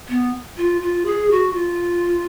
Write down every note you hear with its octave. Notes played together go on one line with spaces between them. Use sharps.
B3
F4
F4
G#4
F#4
F4